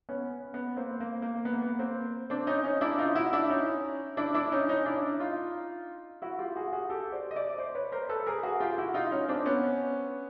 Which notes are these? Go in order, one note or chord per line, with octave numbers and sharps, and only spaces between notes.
B3 C#4
B3
A#3 C4
A#3
A#3
B3
A#3
B3
A#3 C4
C4 D4
C#4 D#4
C#4 D#4
D4 E4
D#4 F4
E4 F#4
D4 E4
C#4 D#4
D4 E4
D4 E4
C#4 D#4
C#4 D#4
D4 E4
D#4 F4
E4 F#4
F4 G4
F#4 G#4
F#4 G#4
G4 A4
C5 D5
D#5
D5 E5
C5 D5
B4 C#5
A#4 C5
A4 B4
A4
G#4 A#4
F#4 G#4
F4 G4
E4 F#4
D#4 F4
C#4 D#4
C4 D4
B3 C#4